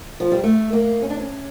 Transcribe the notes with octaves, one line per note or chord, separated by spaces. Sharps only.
F3
G3
A3
A#3
C#4
D4
C#4